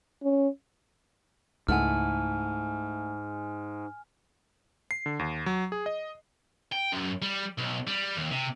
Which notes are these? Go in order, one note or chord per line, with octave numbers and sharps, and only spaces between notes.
C#4
C#2 G#2 A3 E4 F#5 G#5 F6
C7
D3
D#2
F#3
G#4
D#5
G5
F#2
G3
B1
G3
D#2
C3